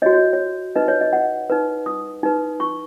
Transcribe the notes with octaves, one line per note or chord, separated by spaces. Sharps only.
F#4 C#5 D#5
C#5
C#5
D#4 B4 D#5
C#5
D#5
F#5
D#4 B4
D#6
D#4 B4
C#6